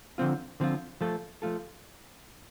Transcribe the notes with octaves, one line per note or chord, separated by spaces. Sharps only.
D3 F3 C4 F4
D3 F3 C4 F4
F3 A3 F4 A4
F3 A3 F4 A4